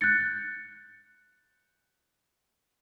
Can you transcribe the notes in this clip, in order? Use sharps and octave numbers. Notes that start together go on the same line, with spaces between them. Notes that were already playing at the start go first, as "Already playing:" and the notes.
F#6 G6 A6 C#7